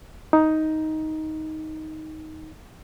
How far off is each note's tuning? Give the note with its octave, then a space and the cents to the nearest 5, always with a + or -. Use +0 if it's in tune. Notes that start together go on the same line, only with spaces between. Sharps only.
D#4 +10